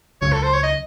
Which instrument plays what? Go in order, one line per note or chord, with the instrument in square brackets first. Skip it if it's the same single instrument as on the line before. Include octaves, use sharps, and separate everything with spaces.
[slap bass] C#2 C#3 F#3 [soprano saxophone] C#5
[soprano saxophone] A4
C5
C#5
D#5